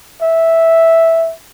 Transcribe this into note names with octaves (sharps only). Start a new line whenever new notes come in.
E5